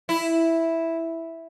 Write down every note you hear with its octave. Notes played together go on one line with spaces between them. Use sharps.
E4